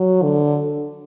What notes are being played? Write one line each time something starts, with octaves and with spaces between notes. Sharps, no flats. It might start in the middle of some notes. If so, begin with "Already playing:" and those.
Already playing: F#3
D3